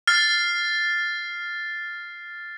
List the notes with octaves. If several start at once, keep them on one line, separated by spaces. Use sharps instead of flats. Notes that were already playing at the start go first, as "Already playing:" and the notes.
F6 A6 C7